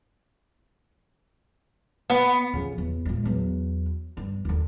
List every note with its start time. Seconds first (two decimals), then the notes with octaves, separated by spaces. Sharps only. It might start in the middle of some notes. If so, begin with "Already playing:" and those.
2.10 B3
2.53 F2 C#3
2.78 E2
3.05 A#2 G#3
3.25 E2 F#3
4.17 G2
4.45 D#2 D3